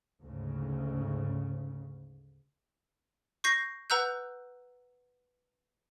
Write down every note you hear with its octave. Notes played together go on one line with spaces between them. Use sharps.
D2 G#2 C#3
C#6 G6 A#6 C7
B4 F#5 A#5 E6 F#6 G6